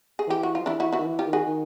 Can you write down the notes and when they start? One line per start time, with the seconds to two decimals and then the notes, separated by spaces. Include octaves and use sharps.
0.19 G#4
0.27 E3 G4
0.43 F#4
0.55 F3 F4
0.66 E3 D4 E4
0.80 E4 F#4
0.93 E4 F#4
0.99 D#3
1.06 E3
1.19 F4 G4
1.25 D#3
1.33 F#4 G#4
1.46 D#3